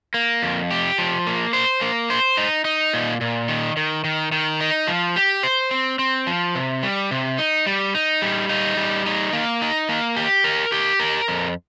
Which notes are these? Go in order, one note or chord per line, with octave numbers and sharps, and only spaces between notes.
A#3
F2
G4
F3
A#3
C5
A#3
C5
D#4
D#4
A#2
A#2
D#3
D#3
D#3
D#3
D#4
F3
G4
C5
C4
C4
F3
C3
G3
C3
D#4
G3
D#4
G3
D#4
G3
D#4
A#3
D#4
A#3
G4
A#4
G4
A#4
F2